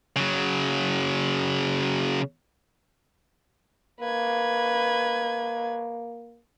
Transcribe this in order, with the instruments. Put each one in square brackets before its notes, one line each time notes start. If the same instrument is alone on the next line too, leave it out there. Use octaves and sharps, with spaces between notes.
[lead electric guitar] C#3 F#3
[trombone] A#3 [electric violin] B4 G#6